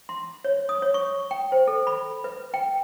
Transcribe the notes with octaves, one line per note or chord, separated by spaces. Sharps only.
C6
C#5
D#6
C#5
C#6
G5
C5
A4
B5
B4
G5